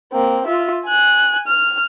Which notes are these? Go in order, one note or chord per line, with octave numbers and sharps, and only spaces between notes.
A#3 C4
F4 E5
G#5 F#6
F6